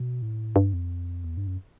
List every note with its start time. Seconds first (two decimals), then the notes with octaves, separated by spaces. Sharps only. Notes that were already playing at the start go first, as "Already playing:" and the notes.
Already playing: B2
0.22 A2
0.56 G2
0.73 F2
1.24 E2
1.37 G2
1.47 F#2